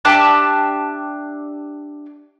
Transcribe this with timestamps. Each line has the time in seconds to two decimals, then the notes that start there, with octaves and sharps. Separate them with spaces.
0.05 D4 G4 E5 A5